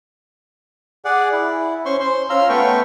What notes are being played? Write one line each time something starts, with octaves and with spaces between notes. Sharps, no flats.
G#4 D5 F#5
E4
C#4 C5 C6 C#6
C5 C6
C#4 F4 F5 A#5 C6 E6
A3 B3 A4 B4 G5 C#6